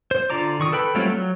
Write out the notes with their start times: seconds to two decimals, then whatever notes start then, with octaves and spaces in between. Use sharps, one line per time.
0.11 C5
0.30 D3 F4 D5 A#5 D6
0.60 D#3 C#6 D#6
0.72 A4 B4 G5 B5
0.95 F#3 G3 A3 C4 F4
1.10 F#3